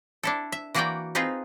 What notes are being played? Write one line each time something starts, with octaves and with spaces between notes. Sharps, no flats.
D4 E4 A4
E5
E3 A#3 F#4 A#4 D5 G5
C4 D#4 F4 G#4 B4